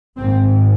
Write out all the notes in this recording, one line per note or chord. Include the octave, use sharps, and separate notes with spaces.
G#1 G#2 C4